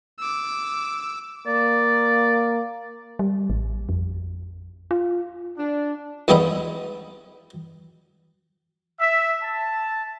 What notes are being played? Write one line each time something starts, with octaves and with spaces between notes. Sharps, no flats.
D6 E6
A#3 D5
G3
A1
F2
F4
D4
E2 G3 G#3 B3 D#4 E5
E5
A5